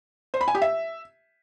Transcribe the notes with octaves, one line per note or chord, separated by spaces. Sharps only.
C5
B5
G#5
G4
E5